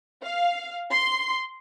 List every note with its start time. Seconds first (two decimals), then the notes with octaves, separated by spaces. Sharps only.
0.23 F5
0.92 C6